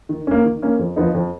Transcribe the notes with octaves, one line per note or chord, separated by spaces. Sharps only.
D#3
A#3 C#4
D#3
A#3 C#4
F2
F3 B3 D#4
F2